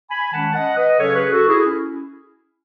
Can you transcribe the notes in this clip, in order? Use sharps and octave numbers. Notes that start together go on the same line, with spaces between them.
G#5 B5
D#3 G#3 C#4 F#5 A5
D#5 F#5
B4 D#5
C#3 F#3 C#4 A4 C#5
G#4 B4
F#4 A4
E4 G#4
C#4